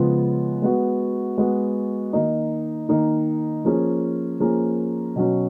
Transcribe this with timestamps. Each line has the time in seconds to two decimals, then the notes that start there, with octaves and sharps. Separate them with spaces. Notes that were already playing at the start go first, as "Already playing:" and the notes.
Already playing: C#3 F3 G#3 B3 F4
0.62 G#3 B3 F#4
1.38 G#3 B3 F#4
2.13 D#3 A#3 D#4
2.89 D#3 A#3 D#4
3.65 F3 A#3 C#4 G#4
4.40 F3 A#3 C#4 G#4
5.15 B2 F#3 C#4